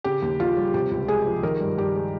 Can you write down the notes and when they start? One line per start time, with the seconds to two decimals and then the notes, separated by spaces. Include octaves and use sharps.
0.04 C#3 G4
0.22 D#2
0.40 D#2 F4
0.57 G3
0.74 C3 G4
0.91 C#2
1.08 G#3 G#4
1.26 F3
1.43 D#3 A#4
1.60 G2
1.77 G2 G4
1.95 G#3